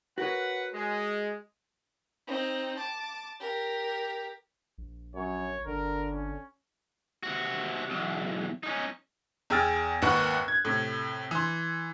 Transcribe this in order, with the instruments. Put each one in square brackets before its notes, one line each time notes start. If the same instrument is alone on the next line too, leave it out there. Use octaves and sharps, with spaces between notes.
[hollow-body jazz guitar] F#4 A#4 C#5 [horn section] B4 F#5
[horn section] G#3
[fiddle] C4 D#4
A5 D6
G4 A#4
[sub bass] A#1
[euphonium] F#2 [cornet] C#5
[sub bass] G1 [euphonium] D3 [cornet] A#4
[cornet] C#4
[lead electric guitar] C3 F#4
B1 E2
C#4 D#4
[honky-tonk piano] E2 G#4 G5 E6 F6 A6
G#1 D#2 B4 F#5 C#6 F#6
G#6
A2 C3
E3 C6